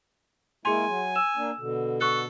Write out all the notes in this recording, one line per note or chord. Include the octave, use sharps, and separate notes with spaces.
G#3 A#3 E4 G#4 G#5 C6
F#3
E6 E7
A#3 D4
B2 D3
A4 C#6 F#6